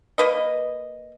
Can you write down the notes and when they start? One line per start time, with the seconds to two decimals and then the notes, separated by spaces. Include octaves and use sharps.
0.18 A#3 B4 D#5